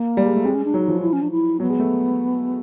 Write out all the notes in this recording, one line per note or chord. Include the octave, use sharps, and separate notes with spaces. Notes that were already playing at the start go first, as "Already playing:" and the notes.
Already playing: A#3
G3
G#3
A3
G#3 C4
C#4
D4
F#3 D#4
F3
F4
E4
C#4
D4
E4
F#3 B3
G#3
A3